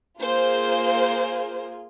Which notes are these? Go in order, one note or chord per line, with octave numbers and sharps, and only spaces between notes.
A#3 F4 G#4 C5